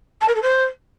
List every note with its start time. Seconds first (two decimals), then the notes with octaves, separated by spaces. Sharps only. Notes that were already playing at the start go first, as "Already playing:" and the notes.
0.21 A5
0.28 A#4
0.35 A4
0.42 C5